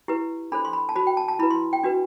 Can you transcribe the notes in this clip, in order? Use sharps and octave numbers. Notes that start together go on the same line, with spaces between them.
E4 G4 B4
D4 A4 C5 B5
C6
B5
A5
F#4 C5 B5
G5
A5
A5
E4 B4 B5
C6
G5
D4 F#4 B4